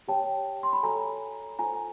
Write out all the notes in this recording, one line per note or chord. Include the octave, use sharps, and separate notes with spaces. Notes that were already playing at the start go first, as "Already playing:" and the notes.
G4 A#4 C#5 G5 A5
C6
B5
F#4 A4 C#5 G#5 A#5
F4 A4 C5 G#5 A#5